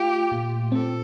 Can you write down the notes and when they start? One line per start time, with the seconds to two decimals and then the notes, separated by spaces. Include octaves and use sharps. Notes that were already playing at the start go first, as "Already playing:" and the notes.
Already playing: A3 F4 G4
0.32 A#2
0.72 C4 A4